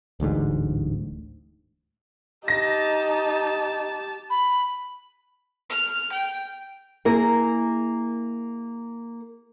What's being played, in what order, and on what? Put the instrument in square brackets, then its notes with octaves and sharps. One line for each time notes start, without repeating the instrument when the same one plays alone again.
[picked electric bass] D1 A1 D2 G#2
[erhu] D#4 [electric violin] G4 A5 [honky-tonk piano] A#6
[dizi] B5
[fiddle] F6
G5
[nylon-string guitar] A#3 E4 G#4 A#4